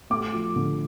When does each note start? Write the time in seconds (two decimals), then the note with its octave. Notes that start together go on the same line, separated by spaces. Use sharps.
0.10 A3 D6
0.33 F3
0.56 D3